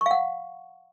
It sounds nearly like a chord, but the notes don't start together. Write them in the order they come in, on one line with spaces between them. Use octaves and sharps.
C#6 F5 F#5